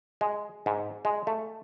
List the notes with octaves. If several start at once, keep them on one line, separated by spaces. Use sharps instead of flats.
G#3
G#2
G#3
A3